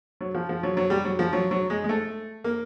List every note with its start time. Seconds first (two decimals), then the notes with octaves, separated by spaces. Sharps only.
0.21 F#3
0.35 F3
0.49 F3
0.63 F#3
0.77 F#3
0.90 G3
1.05 F#3
1.19 F3
1.33 F#3
1.51 F#3
1.70 G#3
1.84 G#3
1.89 A3
2.44 A#3